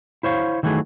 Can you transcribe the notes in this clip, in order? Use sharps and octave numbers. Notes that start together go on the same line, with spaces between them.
E4 C5 C#5 F5
D#3 E3 F#3 A3 G#4